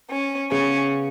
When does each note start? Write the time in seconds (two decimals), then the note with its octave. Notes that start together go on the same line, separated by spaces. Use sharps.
0.10 C#4
0.51 C#3 B3 C#4 G#4